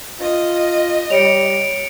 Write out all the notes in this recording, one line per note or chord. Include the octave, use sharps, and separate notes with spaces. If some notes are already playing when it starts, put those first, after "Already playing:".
F4 D#5
G3 C#5 C#7 D7 F7